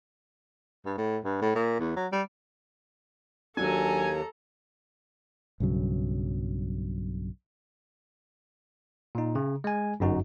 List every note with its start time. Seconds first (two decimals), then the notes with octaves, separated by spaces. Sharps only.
0.86 G2
0.98 A2
1.24 G2
1.42 A2
1.55 A#2
1.79 E2
1.96 F#3
2.12 G3
3.57 D#2 F#3 D4 A4 G#5 A#5
5.60 B1 G2 C#3 F#3
9.15 A#2 D#4
9.35 C#3
9.64 G#3 G#5
10.00 G1 F#2 D#4 F#4